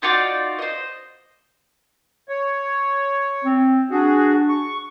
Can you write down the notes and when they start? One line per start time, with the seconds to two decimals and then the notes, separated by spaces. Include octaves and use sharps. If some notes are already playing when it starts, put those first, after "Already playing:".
0.02 D#4 F4 F#4 D5
0.59 C5 D#5
2.29 C#5
3.44 C4
3.91 D4 F#4 G#4
4.49 C#6